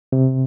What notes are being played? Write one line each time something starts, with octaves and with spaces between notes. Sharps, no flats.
C3